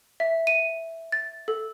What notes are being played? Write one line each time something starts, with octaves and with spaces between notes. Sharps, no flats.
E5
D#7
A6
A4